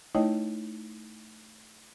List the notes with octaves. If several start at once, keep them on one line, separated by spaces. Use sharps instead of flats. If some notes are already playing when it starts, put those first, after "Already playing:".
A3 D#4 E4 C#5 D#5 G5